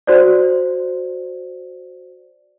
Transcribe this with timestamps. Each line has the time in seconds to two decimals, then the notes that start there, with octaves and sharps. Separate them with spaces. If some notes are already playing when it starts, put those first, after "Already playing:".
0.07 F#4 C5 D5